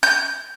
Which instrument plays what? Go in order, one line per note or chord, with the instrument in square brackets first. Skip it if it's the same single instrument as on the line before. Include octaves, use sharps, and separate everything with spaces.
[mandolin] G6